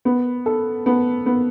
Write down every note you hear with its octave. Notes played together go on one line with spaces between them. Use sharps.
B3
A4
B3
B3